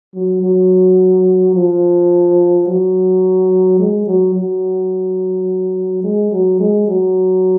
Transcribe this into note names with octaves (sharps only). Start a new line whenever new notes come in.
F#3
F#3
F3
F#3
G#3
F#3
F#3
G#3
F#3
G#3
F#3